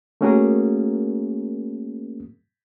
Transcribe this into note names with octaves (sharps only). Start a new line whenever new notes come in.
A3 A#3 C#4 F#4 G#4 A#4